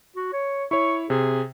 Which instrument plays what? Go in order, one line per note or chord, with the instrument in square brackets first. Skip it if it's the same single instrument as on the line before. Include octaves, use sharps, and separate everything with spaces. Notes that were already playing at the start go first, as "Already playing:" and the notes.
[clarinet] F#4
C#5
[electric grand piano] E4 C#5 [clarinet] C#6
[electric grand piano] C3 [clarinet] G#4